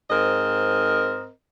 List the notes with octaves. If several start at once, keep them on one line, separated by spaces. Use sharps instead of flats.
G#2 C4 A#4 D#5